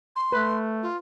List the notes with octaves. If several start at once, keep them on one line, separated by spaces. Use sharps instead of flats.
C6
A3 B4
F4